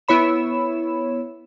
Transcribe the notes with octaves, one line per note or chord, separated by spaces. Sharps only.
B3 E4 C#5 B5 E7